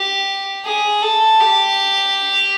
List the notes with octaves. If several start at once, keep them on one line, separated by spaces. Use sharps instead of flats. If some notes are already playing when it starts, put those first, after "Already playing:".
Already playing: G4
G#4
A4
G4